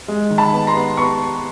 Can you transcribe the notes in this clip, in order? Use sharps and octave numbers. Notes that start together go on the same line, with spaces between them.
G#3
D#3
A5 B5
B3
A#5 C6
B3
B3 B5 C#6